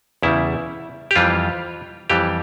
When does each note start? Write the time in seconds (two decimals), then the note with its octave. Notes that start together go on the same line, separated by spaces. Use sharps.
0.23 E2 C#3 G3 E4
1.11 G4
1.16 F2 E3 G3 F4
2.10 F2 E3 G3 G4